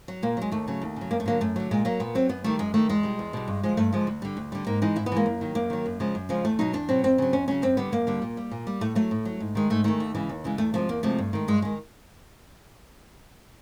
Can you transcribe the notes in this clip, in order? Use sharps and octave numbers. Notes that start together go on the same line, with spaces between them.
F#3
A#2 A#3
F#3 G#3
D#2 A3
C#3 F#3
D#2
C#3 F#3
F#2 A#3
A3
D3 F#3 A#3
F#2 A3
D3 F#3
A#2 G#3
F#3 A#3
A#2 B3
F#3 C4
F#2 B3
D#3 G3 A3
F#2 G#3
D#3 G3 A3
E2 G#3
B2 G3
E2
B2 G3
G2
D3 F3 G#3
G2 A3
D3 F3 G#3
D2
D3 G3
D2
D3 G3
G#2 A#3
E3 G#3 D#4
G#2 E4
B3
E3 G#3 A#3
F#2
D#3 F#3
F#2 A#3
D#3 F#3
F#2
C#3 F3 G#3
F#2
C#3 F3 G#3
E2 A3
B2 F#3 D#4
E2 D4
B2 F#3 C4
F2 C4
C#3 F#3
F2 C#4
C#3 F#3 C#4
F#2 C4
D3 G3 B3
F#2 A#3
D3 G3
A#2
G3
A#2
G3
A2 A3
F#3 A3
A2
F#3
G#2
D#3 G#3
G#2 A3
D#3 G#3 A3
D#2
C#3 E3 G#3
D#2
C#3 E3 G#3
E2 A3
C3 F3 G#3 A3
E2 A#3
C3 F3 G#3 A3
G2
D#3 G#3
G2 G#3
D#3 G#3